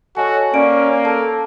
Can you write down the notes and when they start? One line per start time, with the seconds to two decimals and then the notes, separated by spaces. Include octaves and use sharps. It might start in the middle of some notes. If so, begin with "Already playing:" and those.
0.17 F#4 A4 C#5 D#5 G#5
0.54 A#3 C#4 D5 D7
1.05 A4 A5